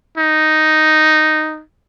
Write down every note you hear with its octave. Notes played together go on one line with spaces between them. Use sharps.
D#4